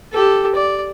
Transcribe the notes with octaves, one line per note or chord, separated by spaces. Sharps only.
G4 A4
D5